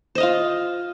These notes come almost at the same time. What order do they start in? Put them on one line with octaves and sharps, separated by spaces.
C5 D#5 F5 F4